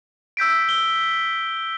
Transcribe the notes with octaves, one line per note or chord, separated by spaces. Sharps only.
E6 G6 B6 D7
G7